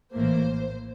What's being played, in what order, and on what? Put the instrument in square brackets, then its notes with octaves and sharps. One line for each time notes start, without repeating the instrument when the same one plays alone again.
[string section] A#1 A2 E3 A#3 C5